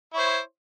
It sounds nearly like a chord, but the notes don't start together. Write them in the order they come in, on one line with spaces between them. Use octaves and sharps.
E4 C#5 C5